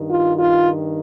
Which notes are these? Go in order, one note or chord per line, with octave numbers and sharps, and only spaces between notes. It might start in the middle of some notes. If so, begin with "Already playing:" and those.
Already playing: G2 D#3
F4
F4